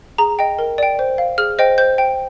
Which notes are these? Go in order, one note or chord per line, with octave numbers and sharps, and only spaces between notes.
G#4 A#5
D#5 G5
A#4
D5 G5
C5
F5
G#4 F6
C5 D#5 G5
C5 G6
G5